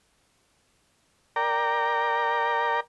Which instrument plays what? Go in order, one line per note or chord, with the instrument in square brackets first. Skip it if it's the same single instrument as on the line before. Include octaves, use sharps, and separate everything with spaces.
[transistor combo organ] A#4 D5 G5 A#5